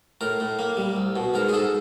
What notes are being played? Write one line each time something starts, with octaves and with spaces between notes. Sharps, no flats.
A2 A#4
A2
A#3
G3
C2
B2
G#2 A#4
G#4
G#2 A4